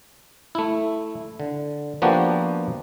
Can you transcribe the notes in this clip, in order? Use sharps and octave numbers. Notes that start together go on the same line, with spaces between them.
A3 E4
D3
F3 A#3 B3 D4 F#4 G4